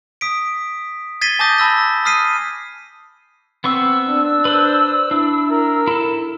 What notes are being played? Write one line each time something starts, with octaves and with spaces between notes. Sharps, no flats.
D#6 B6 D7
G#6 A6 B6 C7 D#7 G7
G#5 A5 D6 D#6 G6 A#6
A5 B5 E6 A#6
D#6 F6 B6 C7 D#7
B3 C4 C#6 E6
D4
B4 C5
D4 E4
A#4
E4 A4